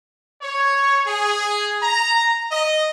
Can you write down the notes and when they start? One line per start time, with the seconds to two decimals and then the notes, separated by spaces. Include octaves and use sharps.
0.42 C#5
1.07 G#4
1.82 A#5
2.52 D#5